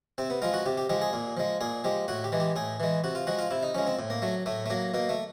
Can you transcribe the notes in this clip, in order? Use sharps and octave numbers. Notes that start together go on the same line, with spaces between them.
C3 C4
B3
F3 G#3 F4
F#4
C3 G4
G4
F3 G#3 G4
G#4
A#2
F3 G#3
A#2 G#4
F3 G#3 G4
A2 F#4
G4
E3 G#3
G4
A2 G#4
E3 G#3
C3 F#4
F4
F3 G#3 F#4
F4
C3 E4
D#4
F3 G#3 C#4
C4
A2
A#3
F#3 A3
A2 A3
A3
F#3 A#3
B2 A#3
A3